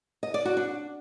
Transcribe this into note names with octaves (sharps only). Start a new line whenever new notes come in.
D#5
D5
F#4
D4